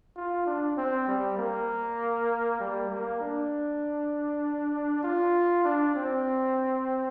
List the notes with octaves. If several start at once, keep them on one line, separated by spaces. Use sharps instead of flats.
F4
D4
C4
G3
A#3
G3
A#3
D4
F4
D4
C4